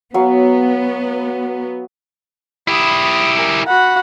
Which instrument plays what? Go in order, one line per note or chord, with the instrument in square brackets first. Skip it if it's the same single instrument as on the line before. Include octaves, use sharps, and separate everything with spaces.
[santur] F#3 C#5 F5 [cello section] B3
[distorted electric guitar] E4 G4 [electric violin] B5 D#6
[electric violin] A#4 G#5
[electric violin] F#4 B5 [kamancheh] F#5